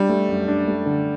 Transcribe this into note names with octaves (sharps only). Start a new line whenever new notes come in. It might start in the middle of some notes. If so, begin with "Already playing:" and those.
Already playing: G3 D4
A3
F#2
D4
A3
D3